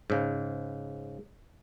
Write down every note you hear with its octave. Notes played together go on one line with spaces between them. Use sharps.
G#2 C#3